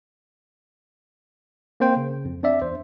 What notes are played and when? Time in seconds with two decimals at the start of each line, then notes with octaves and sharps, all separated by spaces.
1.80 A#3 C4 C5 G5
1.97 C#3
2.25 F2
2.43 C4 D4 D5 E5
2.62 E2 C5